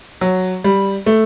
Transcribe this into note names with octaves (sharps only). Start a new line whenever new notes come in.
F#3
G3
A3